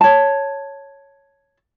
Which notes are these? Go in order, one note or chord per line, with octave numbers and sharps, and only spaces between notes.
C#5 A5